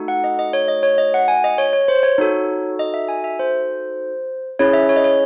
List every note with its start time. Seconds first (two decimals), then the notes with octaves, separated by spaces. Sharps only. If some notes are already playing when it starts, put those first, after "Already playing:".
Already playing: A3 D#4 F#4 A4
0.08 F#5
0.24 D#5
0.39 D#5
0.53 C#5
0.68 D#5
0.83 C#5
0.98 D#5
1.14 F#5
1.28 G#5
1.44 D#5
1.58 C#5
1.73 C#5
1.88 C5
2.03 C#5
2.18 D#4 F#4 A4
2.79 D#5
2.94 E5
3.09 G#5
3.24 E5
3.39 C5
4.59 C#4 E4 G#4 C#5
4.73 E5
4.89 C#5
4.96 D#5
5.04 C#5